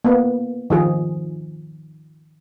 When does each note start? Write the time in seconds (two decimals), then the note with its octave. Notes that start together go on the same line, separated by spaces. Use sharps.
0.05 A#3 B3
0.70 D#3 F3 G#4